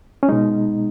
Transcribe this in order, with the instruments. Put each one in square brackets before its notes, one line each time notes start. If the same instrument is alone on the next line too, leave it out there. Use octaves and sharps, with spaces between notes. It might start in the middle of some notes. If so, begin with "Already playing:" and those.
[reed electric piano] C#4
B2 G#3 D#4